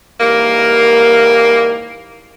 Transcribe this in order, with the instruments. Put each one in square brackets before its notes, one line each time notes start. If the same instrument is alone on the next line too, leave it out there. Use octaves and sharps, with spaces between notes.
[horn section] G#2 E3 G3 A#3